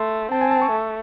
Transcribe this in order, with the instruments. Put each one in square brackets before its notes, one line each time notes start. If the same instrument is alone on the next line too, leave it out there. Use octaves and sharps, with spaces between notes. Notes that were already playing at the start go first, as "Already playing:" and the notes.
Already playing: [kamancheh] A3 [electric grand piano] C6
[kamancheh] C4 [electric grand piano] A5
[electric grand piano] G#5
A5
C#6
[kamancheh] A3